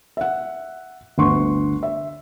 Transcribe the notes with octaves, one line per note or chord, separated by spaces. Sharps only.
E5 F#5
G1 D2 F#5 C6 C#6
E5